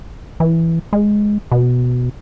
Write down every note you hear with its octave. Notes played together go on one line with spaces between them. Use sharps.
E3
G#3
B2